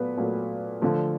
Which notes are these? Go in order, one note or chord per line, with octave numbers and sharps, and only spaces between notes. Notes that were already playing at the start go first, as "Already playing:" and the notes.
Already playing: A#2 F#3 A3 B3 B4
A#2 F#3 A3
D3 F3 A3